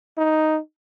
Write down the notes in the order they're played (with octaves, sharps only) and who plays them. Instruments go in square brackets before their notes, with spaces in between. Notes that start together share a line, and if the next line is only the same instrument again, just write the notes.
[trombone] D#4